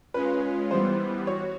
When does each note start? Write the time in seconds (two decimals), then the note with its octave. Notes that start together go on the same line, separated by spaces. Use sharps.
0.14 G#3 C#4 F4 B4
0.71 E3 G3 B3 C5
1.27 F#4 C#5